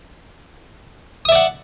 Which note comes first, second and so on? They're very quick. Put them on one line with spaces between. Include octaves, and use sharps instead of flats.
D#6 E5 D5 F#5